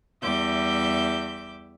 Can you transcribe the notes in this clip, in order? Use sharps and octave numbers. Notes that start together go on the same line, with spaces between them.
E2 G3 E5 D6 G6